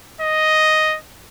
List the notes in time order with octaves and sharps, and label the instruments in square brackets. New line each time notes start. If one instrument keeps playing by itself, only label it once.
[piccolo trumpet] D#5